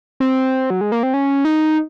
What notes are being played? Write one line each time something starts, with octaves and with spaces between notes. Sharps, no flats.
C4
F#3
G#3
A#3
C4
C#4
D#4